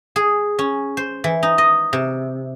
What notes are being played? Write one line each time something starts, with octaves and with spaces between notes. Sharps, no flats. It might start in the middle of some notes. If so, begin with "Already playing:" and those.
G#4
C#4
C5
E3
D#4
D#5
C3